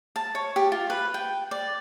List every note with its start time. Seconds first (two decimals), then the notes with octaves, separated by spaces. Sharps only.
0.16 A5
0.35 C#5
0.56 G4
0.72 F4
0.90 B4
1.14 G5
1.51 D5